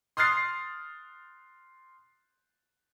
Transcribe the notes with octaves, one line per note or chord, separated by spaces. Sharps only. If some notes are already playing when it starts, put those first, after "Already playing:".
C6 D#6 F6 F#6 A6 C7